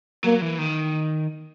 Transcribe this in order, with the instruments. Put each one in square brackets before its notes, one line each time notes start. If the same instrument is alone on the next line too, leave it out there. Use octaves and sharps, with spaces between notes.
[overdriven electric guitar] F#3 [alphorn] A#3
[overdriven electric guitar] E3
D#3